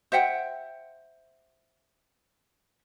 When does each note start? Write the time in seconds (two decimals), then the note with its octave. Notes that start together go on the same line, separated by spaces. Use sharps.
0.12 C5 E5 F#5 G5